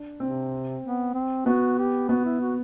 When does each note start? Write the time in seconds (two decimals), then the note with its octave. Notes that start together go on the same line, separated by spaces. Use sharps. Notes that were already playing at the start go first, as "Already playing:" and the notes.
Already playing: D4
0.20 C3 C4
0.84 B3
1.14 C4
1.46 B3 F#4
1.78 G4
2.09 B3 F#4
2.25 E4
2.41 F#4